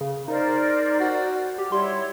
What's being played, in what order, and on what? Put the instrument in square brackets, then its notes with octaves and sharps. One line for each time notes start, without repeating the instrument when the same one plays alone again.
[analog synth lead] C#3
[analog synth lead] D#4 [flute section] A#4 C5 D5
[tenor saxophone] F#4
[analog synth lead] G4
[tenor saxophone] G3 [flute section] E4 C#5 [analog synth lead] C6